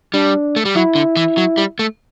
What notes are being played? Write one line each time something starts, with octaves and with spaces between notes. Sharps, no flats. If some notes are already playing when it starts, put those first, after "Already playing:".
G3 D4
A3
G3
F#3 E4
D3
E3
F#3
G3
A3